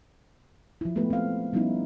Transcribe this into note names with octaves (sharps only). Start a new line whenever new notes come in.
F3 E4
G#3 A3 B3 G4 B4
C4 F5
F3 G3 B3 C#4 D#4 E4